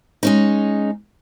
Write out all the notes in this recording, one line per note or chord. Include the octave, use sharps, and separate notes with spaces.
G#3 C#4 D#4